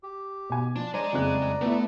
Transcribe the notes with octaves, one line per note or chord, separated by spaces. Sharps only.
G4
B2 G#5
F3 D4
G#3 C5 D5 G#5 A#5
F#1 F2 F#6
A3 B3 E4